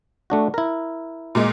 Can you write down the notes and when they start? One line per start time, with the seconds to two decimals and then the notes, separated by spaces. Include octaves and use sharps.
0.30 A3 D4 F#4
0.54 E4 A#4
1.35 A#2 G#3